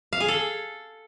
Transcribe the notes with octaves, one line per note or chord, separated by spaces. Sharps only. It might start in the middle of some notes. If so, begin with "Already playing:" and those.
F5
G#4
A4